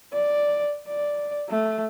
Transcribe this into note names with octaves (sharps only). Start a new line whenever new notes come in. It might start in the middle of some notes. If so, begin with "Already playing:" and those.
D5
D5
A3